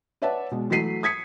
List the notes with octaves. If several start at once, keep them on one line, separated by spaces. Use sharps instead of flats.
B4 C#5 D5 E5 F#5 A5
B2 G#3
E3 F#3 A3 B6 C7 D#7
D#6 G#6 B6 C#7